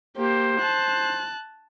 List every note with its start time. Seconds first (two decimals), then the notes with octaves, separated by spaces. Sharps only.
0.17 A#3 G4 C5
0.61 A5 F#6